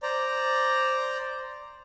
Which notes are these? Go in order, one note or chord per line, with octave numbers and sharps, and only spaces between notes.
C5 D5 A#5